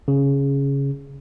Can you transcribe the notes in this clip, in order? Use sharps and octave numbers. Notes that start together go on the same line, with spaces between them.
C#3